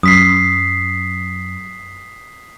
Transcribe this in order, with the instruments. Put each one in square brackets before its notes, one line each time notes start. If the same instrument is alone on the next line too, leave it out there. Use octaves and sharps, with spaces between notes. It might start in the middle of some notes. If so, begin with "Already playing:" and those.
[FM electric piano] F#2 [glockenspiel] D#6 B6 C7